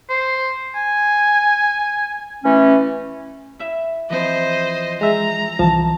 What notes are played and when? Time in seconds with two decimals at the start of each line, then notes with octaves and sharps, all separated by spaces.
0.09 C5
0.75 G#5
2.44 E3 A3 C#4
3.59 E4 E5
4.10 E3 F3 C4 C5 D#5
5.01 G#3 E5 A#5
5.59 C2 E3 F3 A5